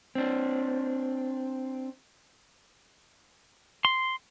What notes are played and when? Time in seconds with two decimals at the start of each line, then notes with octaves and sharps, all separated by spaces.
0.15 C4 D4
3.85 C6